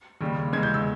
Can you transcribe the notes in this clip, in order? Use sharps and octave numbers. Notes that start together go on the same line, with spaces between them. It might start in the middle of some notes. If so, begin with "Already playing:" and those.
D#2 C#3 G3
E2 C#3 G#3 G#6
G6
E6